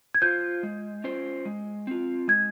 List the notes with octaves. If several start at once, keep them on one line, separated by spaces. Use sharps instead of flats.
G#6
F4 C5 G6
G#3
C#4 F4 C5
G#3
C4 F4
G#3 G#6